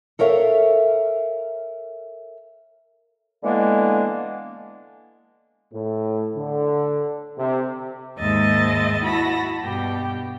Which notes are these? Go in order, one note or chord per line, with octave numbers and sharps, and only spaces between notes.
A4 A#4 C#5 E5 F5
D3 E3 G#3 A#3 B3 D4
A2
D3
C3
D#2 G#2 G#3 D#5 E5 A6
E4 F#4 A5 B5 A#6
G2 B2 G4